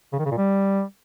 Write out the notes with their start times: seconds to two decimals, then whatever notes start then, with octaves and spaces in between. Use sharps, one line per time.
0.13 C#3
0.19 D#3
0.25 C#3
0.31 A#2
0.37 G3